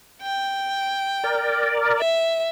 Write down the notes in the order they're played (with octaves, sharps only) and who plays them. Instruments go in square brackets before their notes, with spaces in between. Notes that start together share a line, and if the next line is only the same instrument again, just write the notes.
[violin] G5
[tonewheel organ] A#4 D5
[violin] E5